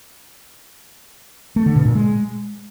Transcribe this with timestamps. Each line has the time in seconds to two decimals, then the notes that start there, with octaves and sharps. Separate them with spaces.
1.56 A3
1.66 D3
1.76 B2
1.86 A#2
1.95 G#3